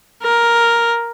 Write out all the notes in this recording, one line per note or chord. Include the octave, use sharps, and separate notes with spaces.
A#4